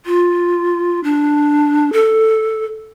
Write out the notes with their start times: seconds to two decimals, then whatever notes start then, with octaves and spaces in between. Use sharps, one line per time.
0.06 F4
1.04 D4
1.93 A4